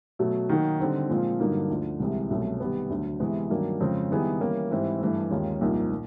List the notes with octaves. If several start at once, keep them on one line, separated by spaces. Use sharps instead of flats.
B2 F#3 A3
D#3 F#3 A#3 D#4 F#4
D3 G3 C4 D#4
A#2 F3 G#3 C4 F4
G2 D3 F#3 A#3 D#4
D2 D3 F3
C2 C3 E3 G#3
C2 B2 F#3 A3 C#4
C3 D#3 G3 B3
D2 D3 F#3
C3 E3 G#3 B3
G2 D#3 F#3 A#3 D4
F2 C#3 F3 G#3 C4
D#3 G3 B3 E4 G#4
E3 G3 A#3 C#4
G#2 E3 G3 C4 E4
G2 E3 A3
D#2 D#3 G#3 C#4 F4
C2 A#2 F3 A#3 D#4
A#2